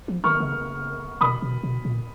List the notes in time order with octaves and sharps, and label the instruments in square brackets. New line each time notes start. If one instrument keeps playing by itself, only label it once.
[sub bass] F3
[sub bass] D#3 [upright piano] C#6 F6
[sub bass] C#3
[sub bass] B2 [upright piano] B5 D#6
[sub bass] B2
B2
A#2